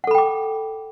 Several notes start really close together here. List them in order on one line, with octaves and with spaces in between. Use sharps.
F#5 A4 B5 G5 D6